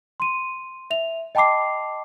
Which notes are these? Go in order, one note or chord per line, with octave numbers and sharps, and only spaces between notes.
C6 D#7
E5 F7
D#5 G5 A5 B5 D6 C7